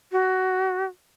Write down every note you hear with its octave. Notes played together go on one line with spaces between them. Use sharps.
F#4